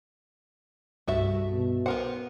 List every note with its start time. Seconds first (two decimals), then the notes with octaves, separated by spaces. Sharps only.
1.08 C2 G2 A3 F#4 E5
1.51 B2
1.86 B3 A#4 C5 F#5